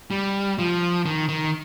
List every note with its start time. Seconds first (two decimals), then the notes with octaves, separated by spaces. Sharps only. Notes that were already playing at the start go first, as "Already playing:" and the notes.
0.11 G3
0.59 F3
1.05 D#3
1.29 D#3